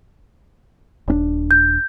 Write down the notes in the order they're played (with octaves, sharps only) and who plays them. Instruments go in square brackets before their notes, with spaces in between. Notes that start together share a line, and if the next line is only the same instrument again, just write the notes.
[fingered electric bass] D#1 C#4 D4
[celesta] G6